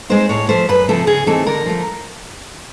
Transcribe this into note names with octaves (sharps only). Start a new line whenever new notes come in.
G#3 C4 D#4 C5
A2 C#5
F3 A3 C5
F#2 B4
C#3 F3 A3 C4 A4
C#3 G#4
E3 A3 C4 D#4 A4
D3 A#4
F3 A3